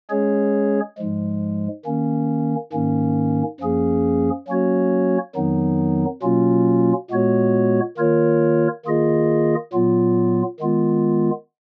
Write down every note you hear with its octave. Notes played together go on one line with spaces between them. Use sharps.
G#3 C#4 G#4 C#5
G#2 F3 G#3
D#3 A#3 C#4
G#2 D#3 A#3 C#4
F#2 F3 A#3 C#4 G#4
F#3 A#3 C#4 F#4 C#5
F2 D#3 F#3 B3 D#4
B2 F#3 A#3 C#4 F4
A#2 G#3 B3 F#4 C#5
D#3 A#3 F4 A#4 C#5
D#3 A#3 F4 G#4 D#5
A#2 F#3 B3 F4
D#3 G#3 B3 F4